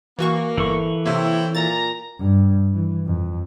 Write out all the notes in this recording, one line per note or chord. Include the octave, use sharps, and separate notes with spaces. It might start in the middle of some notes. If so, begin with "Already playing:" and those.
E3 A#3 F#4 C#6
G1 E3 A4 C#6
C3 A#3 C4 E4 C#5
A#2 A#5 A6
G2
E3
F2